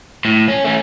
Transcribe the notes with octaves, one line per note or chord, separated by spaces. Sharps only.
A2
C#4
A3 C#4